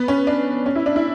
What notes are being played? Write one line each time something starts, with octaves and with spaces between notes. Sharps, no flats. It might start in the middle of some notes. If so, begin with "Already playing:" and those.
Already playing: B3
C#4
D4
C#4
E4
D4
E4